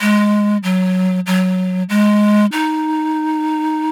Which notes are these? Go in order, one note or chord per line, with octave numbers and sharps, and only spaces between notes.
G#3
F#3
F#3
G#3
D#4